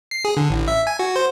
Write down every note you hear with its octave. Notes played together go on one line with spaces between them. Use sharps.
C7
G#4
D3
A1
E5
G#5
F#4
C5